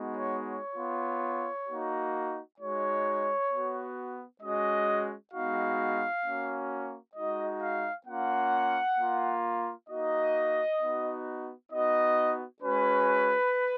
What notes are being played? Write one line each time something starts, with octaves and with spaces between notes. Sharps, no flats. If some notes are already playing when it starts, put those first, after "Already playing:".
Already playing: G#3 B3 D#4 F#4
C#5
C#5
B3 F4
A#3 D#4 F#4
G#3 D#4 F#4 C#5
B3 F#4
G#3 C#4 F#4 D#5
G#3 B3 D#4 F#4 F5
A#3 C#4 F#4
G#3 D#4 F#4 D#5
F5
A#3 C#4 F4 F#5
A#3 F4
A#3 D#4 F#4 D#5
B3 D#4 F#4
B3 D#4 F#4 D#5
G#3 C#4 F#4 B4